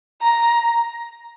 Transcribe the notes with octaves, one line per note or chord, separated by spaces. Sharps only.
A#5